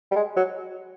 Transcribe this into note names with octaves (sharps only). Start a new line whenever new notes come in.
G3
G#3
F#3